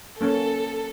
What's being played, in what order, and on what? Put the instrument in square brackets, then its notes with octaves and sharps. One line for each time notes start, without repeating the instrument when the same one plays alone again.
[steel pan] A#3 C#4 [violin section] A4